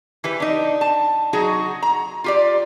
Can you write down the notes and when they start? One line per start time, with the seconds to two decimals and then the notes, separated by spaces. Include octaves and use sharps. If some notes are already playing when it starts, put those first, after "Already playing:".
0.24 E3 G4 B4
0.40 D4 D#4
0.81 A5
1.33 F#3 D#4 F#4 G#4
1.83 A#5
2.24 F4 G4 D5